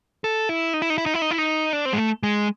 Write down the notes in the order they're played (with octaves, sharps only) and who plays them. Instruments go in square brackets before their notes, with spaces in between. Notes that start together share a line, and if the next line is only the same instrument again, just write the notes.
[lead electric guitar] A4
E4
D#4
E4
D#4
E4
D#4
E4
D#4
E4
D#4
D4
C4
G#3
A3
G#3